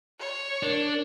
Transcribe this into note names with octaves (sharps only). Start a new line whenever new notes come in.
C#5
D4 A#4